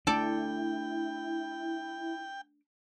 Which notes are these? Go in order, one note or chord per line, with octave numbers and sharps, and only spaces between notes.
A3 D4 E4 A4 D5 G5